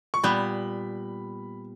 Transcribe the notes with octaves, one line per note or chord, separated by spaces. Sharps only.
C#6
A#2 G3 B3 B5